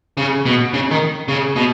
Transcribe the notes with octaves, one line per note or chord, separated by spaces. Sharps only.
C#3
B2
C#3
D#3
C#3
B2